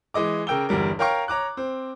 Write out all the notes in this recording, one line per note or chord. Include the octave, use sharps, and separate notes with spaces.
E3 G#3 D#5 D6
C#3 A#4 G5 E6 G7
G1 E2 G3 A#4
A#4 C#5 F5 G5 A#5 C#6
C#5 A#5 D6 F#6
C4